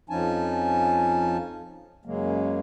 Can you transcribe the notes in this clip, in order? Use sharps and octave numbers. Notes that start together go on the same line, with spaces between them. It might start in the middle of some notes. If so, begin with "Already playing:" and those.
F2 F3 C#4 D#4 G#5 A5
F#2 C#3 F#3 G#3 A#3